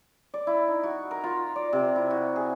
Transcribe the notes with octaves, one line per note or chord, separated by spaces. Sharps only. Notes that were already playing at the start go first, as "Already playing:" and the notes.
D5
E4
D#4
F#4
A#4
F4
D5
C3
E4
F#4
G#4